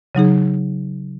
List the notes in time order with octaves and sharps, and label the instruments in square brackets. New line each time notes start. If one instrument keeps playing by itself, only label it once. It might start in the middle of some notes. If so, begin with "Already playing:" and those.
[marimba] C#3 F#3 D#4 G#4